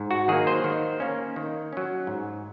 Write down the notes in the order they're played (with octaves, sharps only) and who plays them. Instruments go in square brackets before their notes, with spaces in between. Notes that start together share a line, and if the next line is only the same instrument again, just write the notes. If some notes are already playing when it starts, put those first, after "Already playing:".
Already playing: [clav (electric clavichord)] G#2
F#4
D#3 F#3 A#3 G#4
C5
D#3
A#3 C#4
D#3
F#3 C#4
G#2